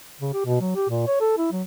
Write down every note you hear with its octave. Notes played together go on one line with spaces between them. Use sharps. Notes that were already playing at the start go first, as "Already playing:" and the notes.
C#3
G4
B2
F#3
G4
A#2
C#5
A4
E4
F#3